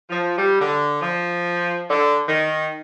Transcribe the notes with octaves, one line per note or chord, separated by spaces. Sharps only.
F3
G3
D3
F3
D3
D#3